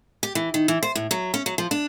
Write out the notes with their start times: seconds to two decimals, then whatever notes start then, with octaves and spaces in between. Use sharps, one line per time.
0.23 G4
0.35 E3
0.54 D#3
0.68 E3
0.83 C5
0.95 A2
1.11 F#3
1.34 C#4
1.46 F#3
1.58 F3
1.71 D4